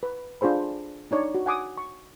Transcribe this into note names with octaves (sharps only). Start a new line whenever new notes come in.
B4
D4 F4 G#4 C5 B5
D4 D#4 C#5 D5
F#4
F#5 G#5 D6 D#6
C#6